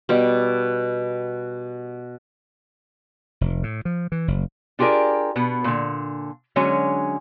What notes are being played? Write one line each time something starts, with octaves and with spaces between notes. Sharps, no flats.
B2 G3
F1
A2
F3
E3
F#1
D4 F4 G4 G#4 A#4 D5
B2 B3
A#2 D3
D3 F#3 G#3 C#4